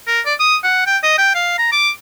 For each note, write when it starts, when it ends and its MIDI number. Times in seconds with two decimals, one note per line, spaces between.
0.07 0.21 70
0.25 0.34 74
0.39 0.56 87
0.64 0.85 78
0.87 0.98 79
1.03 1.17 75
1.18 1.31 79
1.35 1.53 77
1.58 1.70 82
1.72 1.90 86